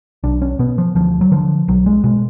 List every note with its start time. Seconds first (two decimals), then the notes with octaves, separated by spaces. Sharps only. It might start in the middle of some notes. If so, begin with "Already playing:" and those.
0.23 B1 D4
0.42 C#4
0.59 B2 B3
0.78 F3
0.95 D2 F3
1.21 F#3
1.32 D3 F3
1.68 B1 F#3
1.86 G#3
2.04 B2 G#3